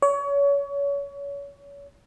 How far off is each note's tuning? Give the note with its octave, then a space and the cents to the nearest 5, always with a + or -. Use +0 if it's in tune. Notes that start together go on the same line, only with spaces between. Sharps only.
C#5 +30